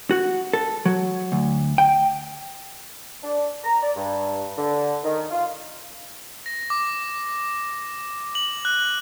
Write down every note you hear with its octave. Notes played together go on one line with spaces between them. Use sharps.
F#4
A4
F#3
D2
G5
D4
A#5
D5
G2
D3
D#3
F4
A#6
D6
F#7
F#6